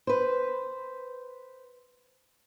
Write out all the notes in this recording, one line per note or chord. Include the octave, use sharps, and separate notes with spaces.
B4 C5